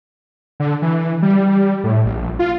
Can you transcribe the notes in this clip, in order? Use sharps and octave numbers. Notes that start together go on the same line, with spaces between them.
D3
E3
G3
A2
A#1
F4